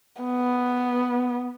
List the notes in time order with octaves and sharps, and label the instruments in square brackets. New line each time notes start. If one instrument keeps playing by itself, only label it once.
[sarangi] B3